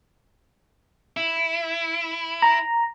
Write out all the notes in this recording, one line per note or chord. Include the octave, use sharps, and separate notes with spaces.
E4
A#5